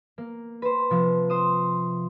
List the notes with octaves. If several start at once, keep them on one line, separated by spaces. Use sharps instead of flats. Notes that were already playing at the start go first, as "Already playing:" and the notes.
A#3
B4 C5
C3 F3
C5 D#6